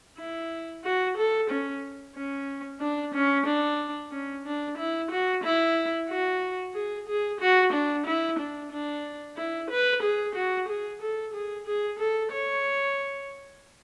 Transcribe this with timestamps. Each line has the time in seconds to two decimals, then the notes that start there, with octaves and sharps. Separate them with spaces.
0.18 E4
0.84 F#4
1.17 A4
1.50 C#4
2.16 C#4
2.81 D4
3.14 C#4
3.46 D4
4.11 C#4
4.45 D4
4.78 E4
5.11 F#4
5.44 E4
6.09 F#4
6.74 G#4
7.08 G#4
7.41 F#4
7.73 D4
8.06 E4
8.39 D4
8.72 D4
9.37 E4
9.71 B4
10.03 G#4
10.35 F#4
10.68 G#4
11.02 A4
11.34 G#4
11.66 G#4
11.99 A4
12.32 C#5